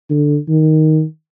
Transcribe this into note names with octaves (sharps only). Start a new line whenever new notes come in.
D3
D#3